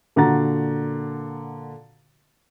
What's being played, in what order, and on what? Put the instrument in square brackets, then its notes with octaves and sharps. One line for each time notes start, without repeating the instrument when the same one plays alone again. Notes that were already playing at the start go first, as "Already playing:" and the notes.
[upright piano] A#2 D3 F#4 F#5 A#5 A6